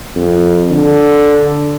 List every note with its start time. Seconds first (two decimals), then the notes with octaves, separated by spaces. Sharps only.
0.15 F2
0.71 D3